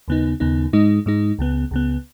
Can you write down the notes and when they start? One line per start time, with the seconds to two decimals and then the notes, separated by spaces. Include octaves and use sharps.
0.08 D#2 C#3 B3 D#4
0.40 D#2 C#3 B3 D#4
0.73 G#2 G#3 D#4
1.06 G#2 G#3 D#4
1.39 C#2 C#3 B3
1.71 C#2 C#3 B3